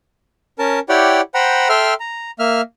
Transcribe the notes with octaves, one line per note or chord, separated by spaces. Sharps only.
C#4 A#4 A5
E4 G4 C#5 D5 F#5 G5
C5 F#5 G5 A#5 B5
A4 E5 G5 C6 F6
A#5
A#3 E5 F6